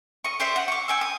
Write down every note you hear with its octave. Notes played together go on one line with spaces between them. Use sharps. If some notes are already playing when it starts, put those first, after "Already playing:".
D#5 C#6
G4 C5 D5 E5
F#5
C#6 D6
G5 G#5 E6
D#6